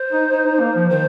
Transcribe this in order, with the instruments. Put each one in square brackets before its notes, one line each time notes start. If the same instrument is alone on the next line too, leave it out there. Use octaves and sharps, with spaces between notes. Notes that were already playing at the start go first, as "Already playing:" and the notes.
Already playing: [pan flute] C5
[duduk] D#4
D#4
D#4
A#3
F3
[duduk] D#3 [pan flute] C5